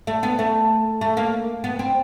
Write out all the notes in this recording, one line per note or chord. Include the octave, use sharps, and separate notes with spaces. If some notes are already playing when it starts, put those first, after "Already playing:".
A3
B3
A3
A3
A#3
B3
C4